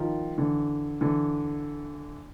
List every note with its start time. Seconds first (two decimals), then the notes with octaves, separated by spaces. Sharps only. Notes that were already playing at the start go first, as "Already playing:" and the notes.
Already playing: D#3 F3
0.38 D3 E3
1.01 D3 E3